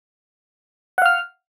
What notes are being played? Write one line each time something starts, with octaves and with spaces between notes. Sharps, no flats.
F5 F#5 F6